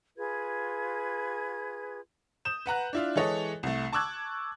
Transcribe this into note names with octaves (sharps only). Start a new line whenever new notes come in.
F4 G#4 B4 G#6
D#6 G6 E7
B4 F#5 A#5 F#6
D4 E4 F4
E3 G#3 A4 C#5 D#5
C2 A3
A5 C#6 D6 E6 F#6 G#6